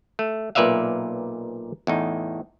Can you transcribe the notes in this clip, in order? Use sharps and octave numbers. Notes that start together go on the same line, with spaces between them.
A3
B1 A#2 B4 D5 E5 F5
E2 A2 D#4